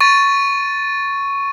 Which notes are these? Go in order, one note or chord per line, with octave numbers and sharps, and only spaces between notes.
C#6 A6 D#7